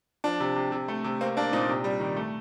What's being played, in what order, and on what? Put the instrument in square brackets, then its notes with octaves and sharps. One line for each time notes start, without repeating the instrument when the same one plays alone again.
[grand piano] F3 D4
C3
C3
C3
A3
C3
A#3 C4
A#3 D4
A#2 C4 D#4
C3
G3
D#3
A3